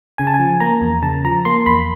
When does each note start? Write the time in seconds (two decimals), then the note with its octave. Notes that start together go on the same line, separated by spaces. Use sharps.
0.18 C#3 G#5
0.27 A5
0.34 G#5
0.39 F3
0.60 A#3 A#5
0.81 E2
1.03 C#3 A5
1.24 F3 A#5
1.45 A#3 C6
1.66 E2 B5